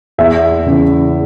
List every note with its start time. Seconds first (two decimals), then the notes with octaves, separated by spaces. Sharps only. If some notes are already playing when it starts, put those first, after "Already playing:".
0.18 E2 E5
0.66 C#3 E3